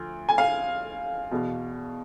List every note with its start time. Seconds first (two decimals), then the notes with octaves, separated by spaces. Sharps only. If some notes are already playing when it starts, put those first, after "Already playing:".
Already playing: D2 F3
0.29 G#5
0.38 F5
1.31 E2 B2